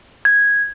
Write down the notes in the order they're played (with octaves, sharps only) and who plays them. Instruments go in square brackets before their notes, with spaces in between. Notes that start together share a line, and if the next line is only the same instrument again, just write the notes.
[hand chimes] G#6